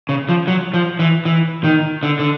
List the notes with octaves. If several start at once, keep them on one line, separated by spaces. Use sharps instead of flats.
C#3
F3
F#3
F3
E3
E3
D#3
D3
D3